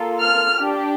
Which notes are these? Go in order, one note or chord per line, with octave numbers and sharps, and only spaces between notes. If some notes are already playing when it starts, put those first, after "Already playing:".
Already playing: A#3 F4 A4
F6
D4 G4